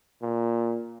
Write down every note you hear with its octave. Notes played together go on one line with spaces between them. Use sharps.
A#2